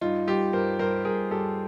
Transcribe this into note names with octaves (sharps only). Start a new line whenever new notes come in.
G2 D#4 F4
G2 F4 G4
G2 A#4 C5
G2 A#4 C5
G2 G#4 A#4
G2 G4 A4